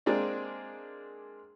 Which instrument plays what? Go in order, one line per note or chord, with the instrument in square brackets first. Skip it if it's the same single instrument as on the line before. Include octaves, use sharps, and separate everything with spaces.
[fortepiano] G#3 A#3 C4 D4 D5